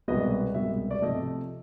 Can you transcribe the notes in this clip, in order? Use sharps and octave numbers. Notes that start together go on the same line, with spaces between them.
C2 B2 G#3 B3 D#5
C2 B2 G#3 B3 E5
D5
C3 F3 A3 D#5